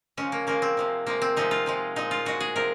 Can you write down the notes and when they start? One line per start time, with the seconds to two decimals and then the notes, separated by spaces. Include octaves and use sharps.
0.17 C#3 F3 G#3 C#4
0.32 A#3
0.47 C#3 F3 G#3 A#3
0.62 C4
0.77 C3 F3 G#3
1.06 C3 F3 G#3 A#3
1.22 C4
1.36 C3 F3 G#3 D#4
1.51 F4
1.66 C3 F3 G#3
1.96 A#2 G#3 D#4
2.11 F4
2.25 A#2 G#3 F#4
2.40 G#4
2.56 C3 F3 G#3 A#4